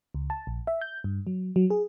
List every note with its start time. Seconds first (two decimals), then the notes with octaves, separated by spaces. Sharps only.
0.15 C#2
0.30 A5
0.47 A#1
0.67 E5
0.81 G6
1.04 G2
1.27 F#3
1.56 F#3
1.70 G#4